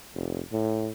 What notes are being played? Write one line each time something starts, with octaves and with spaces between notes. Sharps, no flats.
F1
A2